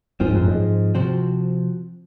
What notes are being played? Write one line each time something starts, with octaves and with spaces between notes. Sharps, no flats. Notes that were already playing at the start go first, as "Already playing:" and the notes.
G#2 F3 C4 F4 G#4 C5
F#2
G#2
C3 F3 C4 F#4 C5